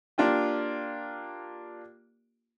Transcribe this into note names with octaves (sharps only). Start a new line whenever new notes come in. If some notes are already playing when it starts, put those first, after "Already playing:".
A#3 D4 F4 G4